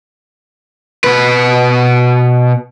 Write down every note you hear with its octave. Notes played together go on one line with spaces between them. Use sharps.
B2 B4